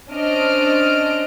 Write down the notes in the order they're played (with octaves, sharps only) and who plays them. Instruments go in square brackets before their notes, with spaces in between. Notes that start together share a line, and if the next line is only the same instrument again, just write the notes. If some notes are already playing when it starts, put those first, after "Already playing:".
[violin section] C#4 D4 C5 D#5 F6 D7